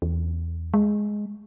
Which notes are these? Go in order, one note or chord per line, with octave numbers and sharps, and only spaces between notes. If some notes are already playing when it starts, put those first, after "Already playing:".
E2
G#3